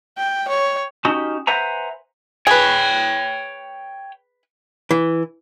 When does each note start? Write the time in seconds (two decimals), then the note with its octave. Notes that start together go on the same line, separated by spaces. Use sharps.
0.18 G5
0.48 C#5
1.05 C#4 D#4 F#4 G4
1.47 B4 C5 E5 F#5 G#5 A#5
2.47 G#4 B4 C#5 G5
4.91 E3